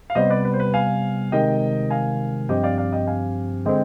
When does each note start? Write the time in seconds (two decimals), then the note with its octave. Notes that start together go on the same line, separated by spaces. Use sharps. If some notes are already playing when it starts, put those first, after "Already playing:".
0.10 F5
0.15 C3 G3 B3 C5 D#5
0.30 B4 D5
0.45 B4
0.53 C5
0.60 B4
0.74 F5 G#5
1.32 C3 D#3 G#3 D#5 G5
1.90 F5 G#5
2.49 G2 F3 C4 G4 D#5 G5
2.63 D5 F5
2.78 D5 F5
2.92 D#5 G5
3.07 F5 G#5
3.65 D3 G#3 C4 D#5 G5